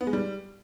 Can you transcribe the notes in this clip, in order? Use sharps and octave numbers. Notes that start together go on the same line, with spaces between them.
B3
G#3
G3